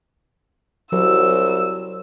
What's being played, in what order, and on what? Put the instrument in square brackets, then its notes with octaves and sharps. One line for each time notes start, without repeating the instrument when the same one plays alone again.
[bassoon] C2 [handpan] F#3 [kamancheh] E6